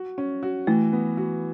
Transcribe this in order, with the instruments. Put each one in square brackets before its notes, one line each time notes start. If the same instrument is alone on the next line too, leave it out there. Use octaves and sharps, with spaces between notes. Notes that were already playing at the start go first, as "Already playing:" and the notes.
Already playing: [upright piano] F#4
C#4
F#4
[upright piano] E3 [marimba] A3
[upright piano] B3
F#4